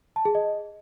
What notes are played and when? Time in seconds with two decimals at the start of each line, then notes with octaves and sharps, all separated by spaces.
0.16 A5
0.25 G#4
0.35 D#5